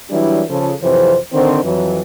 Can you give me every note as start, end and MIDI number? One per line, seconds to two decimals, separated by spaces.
0.10 0.42 52
0.10 0.42 54
0.10 0.42 55
0.10 0.42 62
0.10 0.42 64
0.49 0.72 49
0.49 0.72 53
0.49 0.72 69
0.82 1.16 41
0.82 1.16 48
0.82 1.16 52
0.82 1.16 54
0.82 1.16 72
1.33 1.61 50
1.33 1.61 51
1.33 1.61 60
1.33 1.61 72
1.64 2.01 41
1.64 2.01 52
1.64 2.01 54